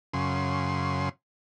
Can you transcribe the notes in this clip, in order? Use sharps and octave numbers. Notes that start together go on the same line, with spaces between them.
F#2 C#3 C6